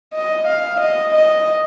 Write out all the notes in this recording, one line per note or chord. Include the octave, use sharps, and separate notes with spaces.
D#5
F5
D#5
D#5